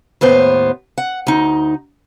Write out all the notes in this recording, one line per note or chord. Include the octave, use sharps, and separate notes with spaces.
D#2 A2 B3 C5
F#5
D2 D#4